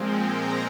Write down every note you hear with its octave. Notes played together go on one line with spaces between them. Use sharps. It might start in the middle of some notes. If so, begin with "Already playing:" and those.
Already playing: A#2 F3 G#3 C4
A#5